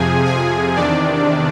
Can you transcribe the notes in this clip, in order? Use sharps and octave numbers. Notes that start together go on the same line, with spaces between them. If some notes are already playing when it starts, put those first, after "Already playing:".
Already playing: F2 C3 F3 G#4 G#5
G#4 G#5
E2 C3 D#3 D4 D5